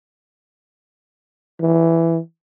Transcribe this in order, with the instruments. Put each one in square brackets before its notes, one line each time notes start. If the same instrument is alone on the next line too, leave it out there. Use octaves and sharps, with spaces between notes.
[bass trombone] E3